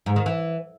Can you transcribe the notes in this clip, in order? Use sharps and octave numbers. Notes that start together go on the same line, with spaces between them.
G#2
D#3
E3